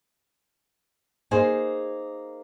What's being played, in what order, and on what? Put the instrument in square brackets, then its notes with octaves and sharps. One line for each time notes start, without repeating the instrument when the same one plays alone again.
[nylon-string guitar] A#3 D#4 G#4 C5